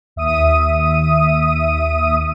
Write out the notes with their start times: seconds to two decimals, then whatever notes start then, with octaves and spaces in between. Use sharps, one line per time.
0.16 D#2 E5 D#6 D#7